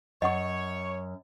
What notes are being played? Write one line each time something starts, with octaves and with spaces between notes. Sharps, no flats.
F#2 C#5 D#5 F#5 C#6